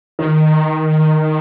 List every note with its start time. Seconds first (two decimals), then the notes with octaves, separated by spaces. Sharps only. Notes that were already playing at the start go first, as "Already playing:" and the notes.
0.19 D#3